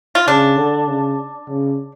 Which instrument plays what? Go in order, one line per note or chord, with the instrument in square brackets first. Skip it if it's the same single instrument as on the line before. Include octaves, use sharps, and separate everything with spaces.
[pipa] F4
[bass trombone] C#3 [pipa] D4
[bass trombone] D3
C#3
C#3